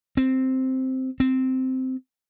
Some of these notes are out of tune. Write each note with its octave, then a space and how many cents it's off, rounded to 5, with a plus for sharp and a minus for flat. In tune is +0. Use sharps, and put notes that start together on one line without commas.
C4 -5
C4 -10